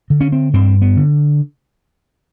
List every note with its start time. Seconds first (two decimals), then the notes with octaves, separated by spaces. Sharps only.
0.10 D3
0.21 C#4
0.32 C4
0.53 G2 C4
0.82 B3
0.97 D3